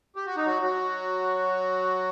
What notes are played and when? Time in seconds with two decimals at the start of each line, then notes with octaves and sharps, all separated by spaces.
0.16 G4
0.26 F#4
0.37 D#4
0.46 F#3 F#4
0.62 F#3 F#4